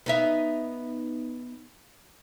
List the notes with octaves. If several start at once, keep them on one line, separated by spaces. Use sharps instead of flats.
B3 D#4 E5